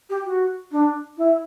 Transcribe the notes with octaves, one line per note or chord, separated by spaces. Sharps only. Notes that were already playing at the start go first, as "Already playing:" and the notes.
G4
F#4
D4
E4